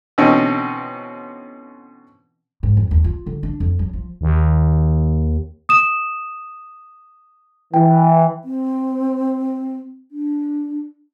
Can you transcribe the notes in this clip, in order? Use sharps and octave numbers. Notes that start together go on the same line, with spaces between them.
B2 D3 E3 C4 C#4 D#4
G#2
F2
D#2
F4
D3
D4
F2
F#3
F3
D#2
D#6 E7
E3 G5
C4
D4